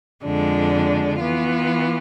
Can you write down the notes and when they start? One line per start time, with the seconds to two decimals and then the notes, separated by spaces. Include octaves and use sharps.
0.24 F2 D3 G#3 D4
1.20 E3 B3 F4